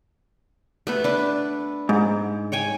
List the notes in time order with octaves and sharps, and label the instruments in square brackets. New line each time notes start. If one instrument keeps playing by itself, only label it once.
[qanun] A3 B3 B4
D4 B4
[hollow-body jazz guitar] G#2
[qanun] C#5 G5 G#5